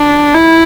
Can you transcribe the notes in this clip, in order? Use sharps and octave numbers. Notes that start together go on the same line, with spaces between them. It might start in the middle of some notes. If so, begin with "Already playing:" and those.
Already playing: D4
E4